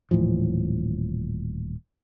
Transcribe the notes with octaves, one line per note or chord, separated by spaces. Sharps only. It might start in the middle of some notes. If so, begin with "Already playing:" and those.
D#1 A2 E3 F3